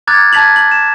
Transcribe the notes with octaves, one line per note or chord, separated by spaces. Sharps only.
A#5 D6 F6 F#6 G#6 A6
A5 G#6 B6 F7 F#7
F#7
E7